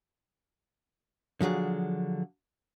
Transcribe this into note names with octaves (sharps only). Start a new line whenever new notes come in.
D3 F3 F#3 G#4